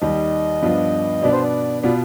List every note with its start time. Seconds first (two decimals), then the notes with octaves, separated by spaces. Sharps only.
0.01 D#2 D#3 G3 D#5
0.62 G2 F3 B3 D4 F4
1.22 B2 B3 D4 D5
1.33 C5
1.43 D5
1.83 B2 B3 F4 D5